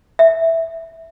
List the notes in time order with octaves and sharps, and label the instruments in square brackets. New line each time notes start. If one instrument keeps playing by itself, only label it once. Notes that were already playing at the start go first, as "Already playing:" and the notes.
[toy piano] E5